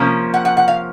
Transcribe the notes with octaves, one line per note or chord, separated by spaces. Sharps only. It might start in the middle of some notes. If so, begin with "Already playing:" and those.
Already playing: C3 F3 A#3 C#4
F#5
F#5
F#5
F5